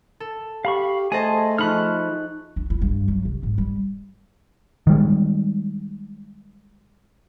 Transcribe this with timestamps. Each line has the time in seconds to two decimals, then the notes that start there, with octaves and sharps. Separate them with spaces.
0.20 A4
0.65 G4 F5 B5 C#6
1.12 A3 G#4 C5 D#5 G#5 A5
1.58 F3 D#4 B5 C#6 F6 F#6
2.56 D4
2.70 E4
2.81 G2
3.08 F#3
3.25 C3
3.43 G#2
3.58 G3
4.87 D#3 G3 G#3